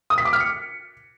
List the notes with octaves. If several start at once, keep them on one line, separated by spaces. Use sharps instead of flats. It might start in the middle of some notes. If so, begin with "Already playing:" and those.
D#6
B6
D6
F6
C#7